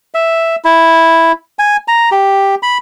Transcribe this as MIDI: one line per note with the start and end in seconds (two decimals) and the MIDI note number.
0.14 0.56 76
0.64 1.32 64
1.59 1.77 80
1.88 2.10 82
2.12 2.55 67
2.63 2.78 83